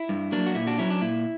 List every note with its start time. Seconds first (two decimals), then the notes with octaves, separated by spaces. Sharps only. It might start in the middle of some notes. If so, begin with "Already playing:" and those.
Already playing: E4
0.09 G2
0.32 F#3 A#3 D4
0.46 F#4
0.55 A#2 E4
0.67 D4 F#4
0.78 F#3 C#4 E4
0.90 D4
1.01 A#2 E4